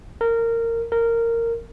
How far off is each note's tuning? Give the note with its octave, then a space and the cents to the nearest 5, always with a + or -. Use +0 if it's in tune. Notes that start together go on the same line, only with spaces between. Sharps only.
A#4 -20
A#4 -15